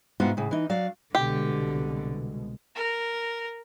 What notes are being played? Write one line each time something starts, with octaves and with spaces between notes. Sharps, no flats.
G#2 C3 B3 F4 F#4
A2 C#3
E3 D#4
F#3 F#4 D5 F5
C2 B2 D3 G#3 G4
A#4